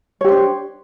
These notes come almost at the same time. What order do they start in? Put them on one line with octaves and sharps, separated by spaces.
C#5 G4 C5 D4